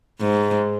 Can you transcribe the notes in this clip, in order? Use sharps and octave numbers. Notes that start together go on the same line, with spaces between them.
G#2